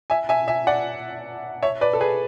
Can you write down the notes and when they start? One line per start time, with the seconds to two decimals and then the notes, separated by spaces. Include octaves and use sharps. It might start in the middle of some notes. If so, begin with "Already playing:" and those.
0.10 E5 G#5
0.29 E5 G#5
0.48 E5 G#5
0.67 D5 F#5
1.62 C#5 E5
1.81 B4 D5
1.93 A4
2.01 G#4 B4